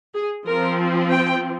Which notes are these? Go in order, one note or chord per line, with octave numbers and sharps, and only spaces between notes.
G#4
F3 C4 A#4
G5